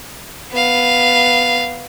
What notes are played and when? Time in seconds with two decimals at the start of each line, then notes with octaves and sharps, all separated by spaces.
0.52 B3 F5